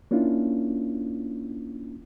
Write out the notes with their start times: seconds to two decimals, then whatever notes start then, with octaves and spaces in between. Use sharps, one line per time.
0.11 A#3 C#4 D4 E4 F4